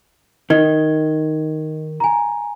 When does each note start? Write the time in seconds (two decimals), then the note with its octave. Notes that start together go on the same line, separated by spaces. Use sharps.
0.50 D#3 D#5 G#6 G7
2.00 G#5 A#5